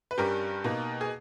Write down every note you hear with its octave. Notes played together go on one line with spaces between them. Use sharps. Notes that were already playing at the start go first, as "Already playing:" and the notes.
B4
G2 G3 C#4 G4 A#4
B2 A#3 D#4
G#4